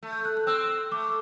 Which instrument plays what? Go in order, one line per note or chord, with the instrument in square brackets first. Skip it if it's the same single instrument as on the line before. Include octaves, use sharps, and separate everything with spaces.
[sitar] A3
[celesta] G6
F#6
F#6
[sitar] C4 [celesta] E6
[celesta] E6
[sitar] A3 [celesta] D6